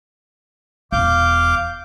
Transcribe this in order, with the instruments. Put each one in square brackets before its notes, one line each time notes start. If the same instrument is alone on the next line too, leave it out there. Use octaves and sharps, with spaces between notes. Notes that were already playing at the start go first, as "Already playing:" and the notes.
[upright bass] E1 E2 [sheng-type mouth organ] F5 D6 G6